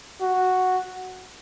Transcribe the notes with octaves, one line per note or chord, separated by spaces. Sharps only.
F#4